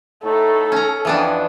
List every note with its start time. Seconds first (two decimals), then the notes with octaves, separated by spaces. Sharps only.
0.23 A2 A3 D#4 A4
0.72 C#4 A#5
1.05 F2 E3 B3 D4